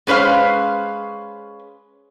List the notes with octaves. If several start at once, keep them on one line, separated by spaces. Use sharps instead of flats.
G#3 C#4 B4 C5 F5